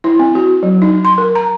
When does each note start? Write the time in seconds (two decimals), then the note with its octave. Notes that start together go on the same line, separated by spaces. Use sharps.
0.04 E4
0.19 C4
0.35 F#4
0.63 F#3
0.82 D#4
1.05 C6
1.18 A#4
1.35 A#5